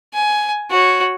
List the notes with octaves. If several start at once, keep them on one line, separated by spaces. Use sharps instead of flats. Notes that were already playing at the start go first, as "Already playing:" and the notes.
G#5
F#4 C#5